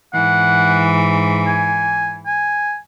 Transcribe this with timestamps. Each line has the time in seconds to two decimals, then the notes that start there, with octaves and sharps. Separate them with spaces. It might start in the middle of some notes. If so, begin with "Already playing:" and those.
0.14 G#2 E3 F#5
1.47 G#5
2.26 G#5